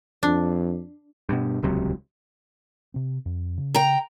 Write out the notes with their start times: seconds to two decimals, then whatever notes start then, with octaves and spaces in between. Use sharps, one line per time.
0.23 F2 D4
1.29 G2 B2
1.62 D#1 C#2 C3 F#3
2.94 C3 C4
3.26 F2
3.58 C#3
3.74 G5 A#5